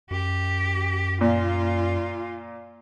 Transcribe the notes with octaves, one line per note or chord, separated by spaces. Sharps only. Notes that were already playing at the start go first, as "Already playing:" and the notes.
F#2 G4
A#2 F4